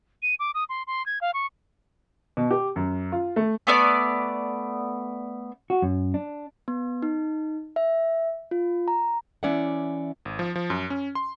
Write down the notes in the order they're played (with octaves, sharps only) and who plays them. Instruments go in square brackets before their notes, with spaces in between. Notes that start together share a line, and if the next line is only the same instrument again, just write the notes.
[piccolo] D#7
D6
D#6
C6
C6
G#6
F5
C#6
[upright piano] B2
G4
F#2
F4
A3
[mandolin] A3 B3 D5
[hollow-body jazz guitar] F#4
F#2
D4
[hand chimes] B3
D#4
E5
F4
A#5
[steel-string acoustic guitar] E3 C#4 D5 E5 F#5
[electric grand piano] G#1
F3
F3
F#2
C#4
C6